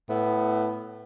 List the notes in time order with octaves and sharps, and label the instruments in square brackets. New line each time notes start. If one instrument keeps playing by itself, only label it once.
[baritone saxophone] A2 [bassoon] B3